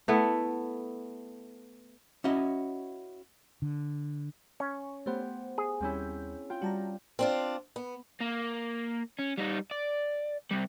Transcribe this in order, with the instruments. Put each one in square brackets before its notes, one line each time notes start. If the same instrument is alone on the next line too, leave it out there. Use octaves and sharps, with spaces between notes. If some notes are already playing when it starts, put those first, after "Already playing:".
[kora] A3 B3 E4
[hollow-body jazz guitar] C#4 E4 F#4 D#5
[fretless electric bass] D3
[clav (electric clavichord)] C#4 [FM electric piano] C#6
[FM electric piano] A3 C5 [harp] B3 G4
[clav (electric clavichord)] G#4
[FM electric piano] D#2 G3 G6 [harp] C4 C#4 E4
[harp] F4 G5
[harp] G3 [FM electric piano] F#4 A5 A#5
[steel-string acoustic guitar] C4 D4 F4
B3
[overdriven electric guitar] A#3
C#4
G3 D#4
D5
C3 G3